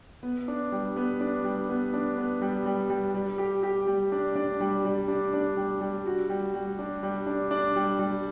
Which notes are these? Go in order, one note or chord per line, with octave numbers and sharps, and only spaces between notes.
B3
D4
G3
B3
D4
G3
B3
D4
B3
G3
G3
G3
G3
G4
G4
G3
D4
D4
G3
G3
D4
D4
G3
G3
F#4
G3
G3
D4
G3
D4
D4
G3
G3